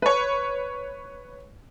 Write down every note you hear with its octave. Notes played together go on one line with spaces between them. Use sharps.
B4 C#5